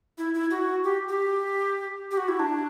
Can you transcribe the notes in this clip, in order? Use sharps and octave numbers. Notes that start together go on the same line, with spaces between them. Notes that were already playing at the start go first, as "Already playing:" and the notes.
E4
E4
F#4
G4
G4
G4
F#4
E4
D4